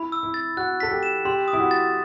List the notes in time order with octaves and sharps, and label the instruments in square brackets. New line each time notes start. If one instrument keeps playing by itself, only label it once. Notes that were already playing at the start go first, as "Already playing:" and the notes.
Already playing: [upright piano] E4 [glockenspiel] B5
[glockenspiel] E6
[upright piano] E4
[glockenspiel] A6
[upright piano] F#4 [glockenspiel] F#6
[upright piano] A4 [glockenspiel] B6
[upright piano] G4
[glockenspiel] E7
[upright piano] G4 [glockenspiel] C6
[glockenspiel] D#6
[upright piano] E4
F#4
[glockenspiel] A6